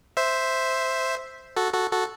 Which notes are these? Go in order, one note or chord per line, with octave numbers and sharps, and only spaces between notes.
C5 E5
F#4 A4
F#4 A4
F#4 A4